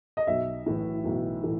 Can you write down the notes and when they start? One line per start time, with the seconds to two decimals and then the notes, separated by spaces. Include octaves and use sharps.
0.17 D#5
0.27 B1 E5
0.66 A2 E3 A3
1.05 B1
1.43 A2 E3 A3